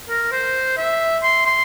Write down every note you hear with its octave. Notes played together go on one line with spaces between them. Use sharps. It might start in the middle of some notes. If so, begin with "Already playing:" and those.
A#4
C5
E5
C6
C6